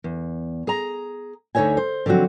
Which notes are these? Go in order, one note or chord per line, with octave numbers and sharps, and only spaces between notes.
E2
G#4 A#5
D2 D3 D#4 C#5 E5 G#5
C5
D3 F3 F#3 C4 F#4